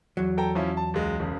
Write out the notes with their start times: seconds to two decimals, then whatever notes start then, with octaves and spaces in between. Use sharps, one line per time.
0.17 E2 F#3
0.37 A4 G5 A#5
0.55 F3 C#4 E4
0.77 A5
0.94 C#2 G#3
1.19 E1 C#3